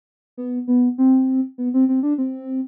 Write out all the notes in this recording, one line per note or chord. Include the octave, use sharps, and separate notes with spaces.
B3
B3
C4
B3
C4
C4
D4
C4